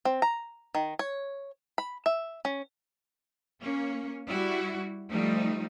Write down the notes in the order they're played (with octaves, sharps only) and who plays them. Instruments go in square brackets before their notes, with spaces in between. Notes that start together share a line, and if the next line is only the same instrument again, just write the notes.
[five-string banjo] C4
A#5
D#3
C#5
B5
E5
C#4
[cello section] A#3 C#4
G3 E4 F#4
F3 G3 A3 D#4